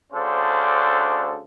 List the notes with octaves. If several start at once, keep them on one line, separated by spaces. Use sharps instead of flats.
D2 C#3 D4 A4 C5